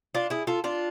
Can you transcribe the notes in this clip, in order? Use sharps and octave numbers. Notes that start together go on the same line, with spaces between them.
D4 F4
E4 G#4
F4 A4
D4 F4